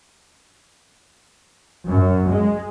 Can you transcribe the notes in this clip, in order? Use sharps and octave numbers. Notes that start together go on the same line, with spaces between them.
F#2
G#3